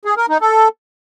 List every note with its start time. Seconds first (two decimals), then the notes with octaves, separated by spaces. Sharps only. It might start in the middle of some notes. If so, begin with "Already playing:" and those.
0.05 G#4
0.17 A#4
0.29 D#4
0.41 A4